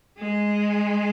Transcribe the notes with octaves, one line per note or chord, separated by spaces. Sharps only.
G#3